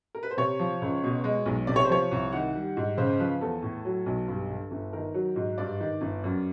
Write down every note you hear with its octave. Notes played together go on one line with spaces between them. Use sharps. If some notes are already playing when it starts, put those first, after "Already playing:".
A#4
B4
C5
C3 C#5
F3
C#2
B2
G#3
B1
C3 D5
C#5
C5
F3 C#5
C2
D#3 F#5
G3
G#2
C#3 C5
F3 B4
E2 A4
A2
F#3
B1
G2
D3
G1
D#3 A#4
F#3
G#2
G2 D5
D#3
G1
F#2